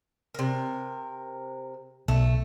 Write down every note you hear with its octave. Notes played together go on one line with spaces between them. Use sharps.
C3 A#4
B1 A3